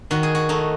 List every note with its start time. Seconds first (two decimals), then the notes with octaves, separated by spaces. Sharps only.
0.11 D#3 F#4
0.23 G#4
0.35 F#4
0.49 A3 D#4